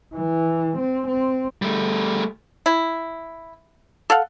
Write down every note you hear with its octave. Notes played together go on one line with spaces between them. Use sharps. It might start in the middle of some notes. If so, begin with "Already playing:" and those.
E3
C4
C4
G3 A3
E4
A4 F5 F#5